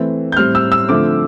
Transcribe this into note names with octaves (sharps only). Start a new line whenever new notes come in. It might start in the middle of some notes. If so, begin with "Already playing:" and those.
Already playing: E3 A3 C4
G6
A2 G3 C4 F6
E6
E6
D3 F3 A3 C4 D6